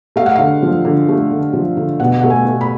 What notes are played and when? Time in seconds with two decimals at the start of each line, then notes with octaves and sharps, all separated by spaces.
0.16 A3 F5
0.26 F#5
0.36 D3 F5
0.63 F3
0.85 D3
1.09 A3
1.31 D3
1.53 F3
1.77 D3
2.00 B2 F#5
2.21 A3 F#5
2.30 G#5
2.45 A3
2.61 B5